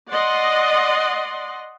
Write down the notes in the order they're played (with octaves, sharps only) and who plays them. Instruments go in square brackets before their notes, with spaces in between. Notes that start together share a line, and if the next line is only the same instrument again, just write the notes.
[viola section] D5 D#5 F#5 C6